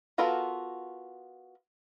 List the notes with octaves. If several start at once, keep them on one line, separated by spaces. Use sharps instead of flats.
B3 F4 F#4 A4 A#4